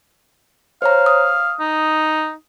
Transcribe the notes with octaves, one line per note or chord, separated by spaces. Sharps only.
C5 C#5 F5 A#5
D#6
D#4